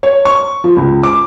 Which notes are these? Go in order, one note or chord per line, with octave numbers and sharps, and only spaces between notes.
C#5
C#6
F3
C#2
D6